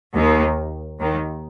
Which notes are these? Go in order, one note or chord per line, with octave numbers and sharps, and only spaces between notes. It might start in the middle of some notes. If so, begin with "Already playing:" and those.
D#2 D#3
D#2 D#3